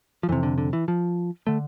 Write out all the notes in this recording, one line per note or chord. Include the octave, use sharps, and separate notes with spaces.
F3
F2 C3 E3
D3
D3
E3
F3
D3 A3